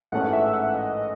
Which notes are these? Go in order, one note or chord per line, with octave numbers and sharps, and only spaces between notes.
A1 G#2 E3 A3 C#4 F#5
E5
F#5
D#5